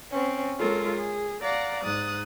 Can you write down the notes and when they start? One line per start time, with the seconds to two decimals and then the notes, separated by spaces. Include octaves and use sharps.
0.10 C4 C#4
0.59 G#3 F4 A4 A#4 C#5
0.96 G#4
1.41 D5 F5 F#5 A#5
1.82 G#2 D#6 F#6 A6